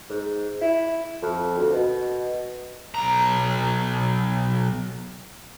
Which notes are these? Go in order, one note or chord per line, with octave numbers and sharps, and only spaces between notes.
G#2
E4
F2
D2
B2
B1 A#5